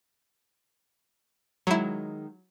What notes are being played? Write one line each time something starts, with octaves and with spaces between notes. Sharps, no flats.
D#3 F#3 G#3 E4